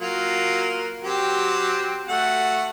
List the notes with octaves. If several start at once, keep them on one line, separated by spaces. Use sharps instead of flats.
F#3 A#3 F4
F#3 C4 G4
A3 F#4 F#5